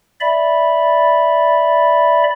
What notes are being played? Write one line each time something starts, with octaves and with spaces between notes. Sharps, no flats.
D5 E5 B5